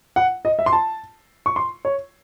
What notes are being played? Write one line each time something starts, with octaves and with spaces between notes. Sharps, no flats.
F#5
D#5
E5
C6
A5
C#6
C6
C#5